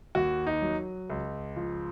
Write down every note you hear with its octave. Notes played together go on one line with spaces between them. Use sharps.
D#2 F#4
D#4
F#3
C#2
F3